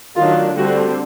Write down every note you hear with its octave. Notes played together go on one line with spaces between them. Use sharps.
D#3 F#3 A3 D4 F4
D3 G3 C4 F#4